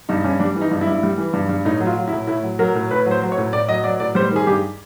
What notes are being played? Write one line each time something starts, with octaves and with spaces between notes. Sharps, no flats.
G2 D#4
G2 C#4
G3 D4
E3
D#4
G2
E4
G2
G3
E3
G2
G2
A2 D#4
F#3
F4
F#3
E4
A2
A2 E4
F#3
F#3 A#4
A2
A2 B4
F#3
C5
F#3
C#5
A2
A2 D5
F#3 D#5
F#3 D5
A2 D5
G3 C5
D#3 G#4
G2 G4